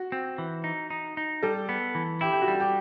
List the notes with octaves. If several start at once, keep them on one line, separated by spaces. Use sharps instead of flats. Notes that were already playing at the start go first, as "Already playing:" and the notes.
Already playing: F#4
C4
E3
D#4
D#4
D#4
G3 A4
B3
E3
E4 G4
G4
F#4
G3
G4